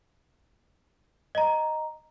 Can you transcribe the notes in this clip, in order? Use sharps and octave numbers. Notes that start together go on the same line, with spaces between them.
D#5 A#5